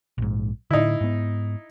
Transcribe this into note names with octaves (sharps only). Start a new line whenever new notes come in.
A#1 G#2
A2 D3 D#4 E4
G#2 B3